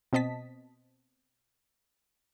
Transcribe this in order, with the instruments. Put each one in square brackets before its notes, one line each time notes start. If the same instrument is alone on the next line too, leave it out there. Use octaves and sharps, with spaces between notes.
[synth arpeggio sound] B2 C4 D#5 A5 B6